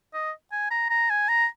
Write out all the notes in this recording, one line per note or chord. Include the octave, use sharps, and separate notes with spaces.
D#5
G#5
A#5
A#5
G#5
A#5